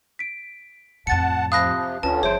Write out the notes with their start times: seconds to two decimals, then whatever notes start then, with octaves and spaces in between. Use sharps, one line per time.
0.19 B6 D7
1.07 F2 A2 F#5 A5 A6 C#7
1.52 C3 F3 F5 A5 B5 D#6 F#6 A#6
2.03 D2 D3 C#4 F4 B4 A5
2.23 G1 F3 G#4 C5 C#5 E5 D7